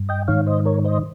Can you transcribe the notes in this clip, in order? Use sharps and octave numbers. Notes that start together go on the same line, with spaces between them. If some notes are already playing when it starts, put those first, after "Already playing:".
Already playing: G2
D#5 G5
G#2 D#3 C#5 F5
C5 D#5
A#4 C#5
C5 D#5